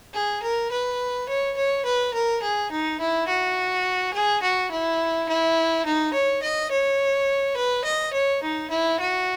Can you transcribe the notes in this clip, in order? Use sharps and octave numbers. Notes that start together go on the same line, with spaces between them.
G#4
A#4
B4
C#5
C#5
B4
A#4
G#4
D#4
E4
F#4
G#4
F#4
E4
E4
D#4
C#5
D#5
C#5
B4
D#5
C#5
D#4
E4
F#4